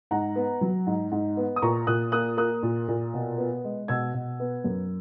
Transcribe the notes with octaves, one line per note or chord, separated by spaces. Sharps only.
G#2 F#5 A#5
B3
F#3
G#2
G#2
B3
D#6
A#2 A#5 C#6
A#2 D#6 F#6
A#3 D#6 F#6
A#3 D#6 F#6
A#2
A#2
B2
B3
G#3
B2 E6 G#6
B2
B3
F#2